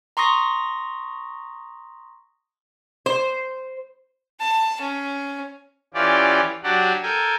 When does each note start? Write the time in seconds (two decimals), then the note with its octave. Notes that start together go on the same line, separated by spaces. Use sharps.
0.17 A#5 C6 C#6 D#6 A#6
3.06 C5
4.40 A5
4.81 C#4
5.94 E3 C#4 F4 G4 D5
6.63 F#3 D4 F#4 G4 D5 F#5
7.03 A4 A#4 G5 G#5